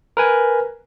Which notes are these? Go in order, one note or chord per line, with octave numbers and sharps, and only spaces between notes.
A#4 B4 G#5